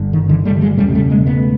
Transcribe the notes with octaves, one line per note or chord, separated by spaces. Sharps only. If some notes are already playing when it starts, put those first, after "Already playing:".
Already playing: G1 G2 D3
D#3
D3 E3
G3 A3
F#3 G#3
E1 E2 C#3 G3 A3
G3 A3
G#3 A#3
A3 B3